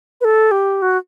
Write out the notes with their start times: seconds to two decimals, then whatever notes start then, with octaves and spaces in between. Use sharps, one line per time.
0.21 B4
0.24 A4
0.51 G4
0.82 F#4